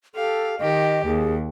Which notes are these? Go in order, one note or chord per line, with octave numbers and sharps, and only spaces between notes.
G4 A4 F5
D#3 G4 D#5
D#2 G#4